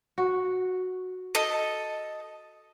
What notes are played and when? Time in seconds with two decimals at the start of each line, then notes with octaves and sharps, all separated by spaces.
0.18 F#4
1.35 A4 D#5